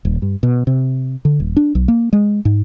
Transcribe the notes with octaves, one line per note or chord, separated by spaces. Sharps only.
D#1
G2
B2
C3
D3
D#1
D4
B1
A#3
G#3
G#2